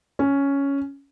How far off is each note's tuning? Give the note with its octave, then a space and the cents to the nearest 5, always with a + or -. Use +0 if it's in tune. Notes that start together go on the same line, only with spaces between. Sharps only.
C#4 +5